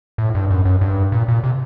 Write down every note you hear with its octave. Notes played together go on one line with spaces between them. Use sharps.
A2
G2
F#2
F#2
G2
A#2
A#2
C3